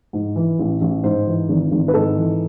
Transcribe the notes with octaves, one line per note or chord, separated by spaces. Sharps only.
G#2
E3
A1
A1
G#2 C5
E3
G#1
G#1
B4
G#2 A4
E3